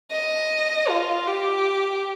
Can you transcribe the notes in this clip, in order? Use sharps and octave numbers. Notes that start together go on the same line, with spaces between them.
D#5
F4
G4